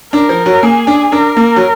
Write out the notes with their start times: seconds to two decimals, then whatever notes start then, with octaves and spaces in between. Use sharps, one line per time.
0.13 D4 A#4
0.29 F3
0.46 F#3
0.63 A#3 G#4
0.87 D4
1.12 D4 A#4
1.37 A#3
1.56 F#3